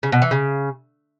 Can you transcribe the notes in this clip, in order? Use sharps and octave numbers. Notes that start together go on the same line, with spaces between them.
C#3
B2
E3
C#3